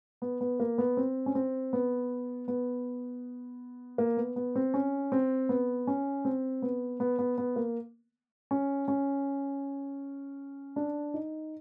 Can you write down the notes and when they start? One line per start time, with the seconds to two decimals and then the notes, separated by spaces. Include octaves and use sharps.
0.22 B3
0.41 B3
0.60 A#3
0.78 B3
0.97 C4
1.26 C#4
1.35 C4
1.73 B3
2.48 B3
3.98 A#3
4.17 B3
4.36 B3
4.55 C4
4.74 C#4
5.12 C4
5.49 B3
5.87 C#4
6.25 C4
6.62 B3
7.00 B3
7.19 B3
7.38 B3
7.56 A#3
8.51 C#4
8.88 C#4
10.76 D4
11.14 D#4